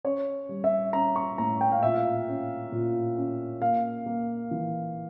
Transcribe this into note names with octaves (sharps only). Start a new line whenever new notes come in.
C#4 C#5
G3
E5
C#4 A#5
C#6
A2 A#5
G5
F5
A#2 E5
F5
C#4
A#2
C#4
A#3 F5
A#3
E3